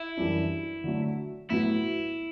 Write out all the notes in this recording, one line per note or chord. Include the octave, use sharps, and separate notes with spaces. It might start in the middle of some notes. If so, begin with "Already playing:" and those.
Already playing: E4
F#2 E3 G3 D4
D3 F#3 A3
A2 F#3 B3 E4 F#4